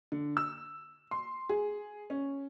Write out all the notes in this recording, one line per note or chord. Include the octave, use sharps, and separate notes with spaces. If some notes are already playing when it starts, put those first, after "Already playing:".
D3
E6
C6
G#4
C#4